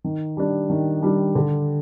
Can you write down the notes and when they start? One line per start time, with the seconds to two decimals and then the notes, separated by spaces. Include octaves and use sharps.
0.04 D#3
0.37 G3 D4
0.70 D#3
1.03 G3 D4
1.35 D3